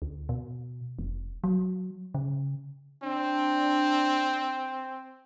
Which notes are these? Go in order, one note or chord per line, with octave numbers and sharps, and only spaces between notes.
D2
B2
F1
F#3
C#3
C4 D4